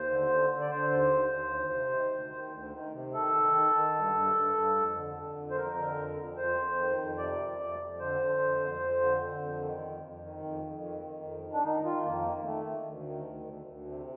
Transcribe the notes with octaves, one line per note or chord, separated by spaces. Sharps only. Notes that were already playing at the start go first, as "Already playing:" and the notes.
Already playing: D#2 C5
D3
D3
D3
D5
D3 C5
D#2
D#2
D#2
D2
C3
D#3
D2
D#3
D2
D#3
C3
D#3 A4
D#3
D#3
D#3
G2
G2
G2
G2
F2
D3
D3
F2
C5
F2 A#4
D3
F2
F2
F2 C5
F2
D#3
F2
C3 D5
F2
F2
F2
D3 C5
D3
F2
F2
F2
D3
D3
F2
D#3
F2
F2
D#3
F2
F2
D#3
D#3
F2
D#3
D4
D#3 D#4
D#3 F4
F2 A#3
D#3
D#3 A3
D#3
D2
D#3
D2
D2
D2
C3